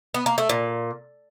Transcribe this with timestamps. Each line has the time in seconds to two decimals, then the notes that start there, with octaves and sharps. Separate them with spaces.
0.14 B3
0.26 A#3
0.38 A3
0.49 A#2